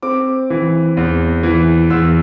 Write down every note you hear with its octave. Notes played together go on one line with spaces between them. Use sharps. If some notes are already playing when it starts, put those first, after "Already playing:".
C4 D6
E3
E2
E3
E2 E6